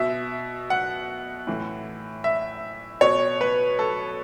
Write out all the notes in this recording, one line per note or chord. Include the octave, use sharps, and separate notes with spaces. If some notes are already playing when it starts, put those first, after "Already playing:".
Already playing: B2 E5
F#5
A2 E3
E5
B2 C#5
B4
A4